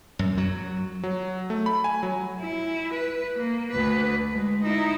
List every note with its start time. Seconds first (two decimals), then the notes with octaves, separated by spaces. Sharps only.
0.19 F#2
0.37 F#3
1.03 F#3
1.50 A3
1.66 B5
1.84 G#5
2.03 F#3
2.40 E4
2.94 B4
3.38 A#3
3.71 D2 B4
4.32 G#3
4.64 D#4 E4